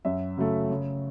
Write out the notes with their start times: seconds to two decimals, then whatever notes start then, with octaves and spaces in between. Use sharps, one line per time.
0.05 F#2 E5
0.38 C#3 F#3 A3
0.70 C#3